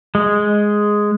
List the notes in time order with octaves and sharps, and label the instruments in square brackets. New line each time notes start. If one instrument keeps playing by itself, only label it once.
[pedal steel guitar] G#3